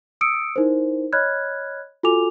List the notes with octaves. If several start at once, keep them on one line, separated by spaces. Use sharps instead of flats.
D#6 E6 C#7 D7
D#4 E4 A#4 C5
C#5 D#5 B5 F6 F#6 G#6
F4 F#4 A4 G#5 D6 F7